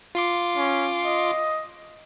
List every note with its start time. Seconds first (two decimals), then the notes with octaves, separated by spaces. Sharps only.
0.15 F4 C6 D6
0.57 C#4
1.05 D#5